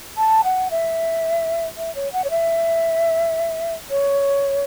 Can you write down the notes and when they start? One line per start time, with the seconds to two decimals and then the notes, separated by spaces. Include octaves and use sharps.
0.17 A5
0.44 F#5
0.71 E5
1.77 E5
1.95 C#5
2.13 F#5
2.24 C#5
2.30 E5
3.90 C#5